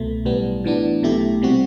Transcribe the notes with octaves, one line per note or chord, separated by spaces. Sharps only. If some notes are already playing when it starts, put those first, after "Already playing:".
Already playing: C2 B2 A3
B1 A2 G3 B3
A2 E3 B3 D4
B1 B2 A3 E4 G4
C3 G3 C4 F#4